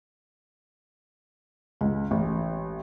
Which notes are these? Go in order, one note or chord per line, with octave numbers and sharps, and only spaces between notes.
C#2
A1